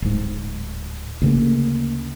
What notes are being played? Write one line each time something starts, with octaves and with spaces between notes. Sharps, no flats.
D1 G#2
D2 C#3 A#3